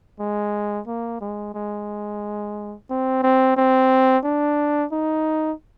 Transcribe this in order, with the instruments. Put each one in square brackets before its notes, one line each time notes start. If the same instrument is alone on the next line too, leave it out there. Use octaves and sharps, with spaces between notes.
[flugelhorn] G#3
A#3
G#3
G#3
C4
C4
C4
D4
D#4